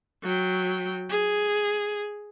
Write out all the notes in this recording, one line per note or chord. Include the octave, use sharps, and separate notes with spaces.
F#3 G5
G#4